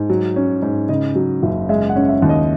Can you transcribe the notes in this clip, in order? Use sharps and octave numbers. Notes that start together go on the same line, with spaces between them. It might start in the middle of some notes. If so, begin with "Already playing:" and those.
Already playing: G#2
F#3
C#4
G#2
C#3 D#5
F#3
F#1
G#3 E5
F#5
C#4
E5
D#2
D#5